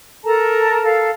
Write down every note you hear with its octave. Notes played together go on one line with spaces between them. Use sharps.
A4 A#4 A5 A#5
A4 F5